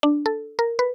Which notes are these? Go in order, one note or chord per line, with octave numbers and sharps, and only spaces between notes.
D4
A4
A#4
B4